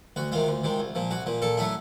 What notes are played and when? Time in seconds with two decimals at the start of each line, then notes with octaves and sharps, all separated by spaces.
0.16 D2 F#4
0.32 C3 D#3 G#3 F4
0.48 D2
0.64 C3 D#3 G#3
0.79 C2
0.95 A#2 F3
1.11 C2 F#4
1.26 A#2 F3
1.42 A#2 A4
1.57 F#3 A3 C#4 E4